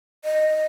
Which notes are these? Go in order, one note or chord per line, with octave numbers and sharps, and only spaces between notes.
D#5